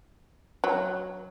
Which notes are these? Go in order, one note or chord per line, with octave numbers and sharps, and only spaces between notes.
F#3